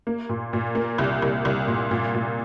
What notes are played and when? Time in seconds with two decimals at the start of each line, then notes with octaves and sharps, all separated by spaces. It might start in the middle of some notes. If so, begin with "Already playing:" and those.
0.07 A#3
0.29 A#2
0.53 A#2
0.75 A#3
0.98 C2
1.22 C2
1.45 C2
1.67 A#2
1.91 A#2
2.14 A#2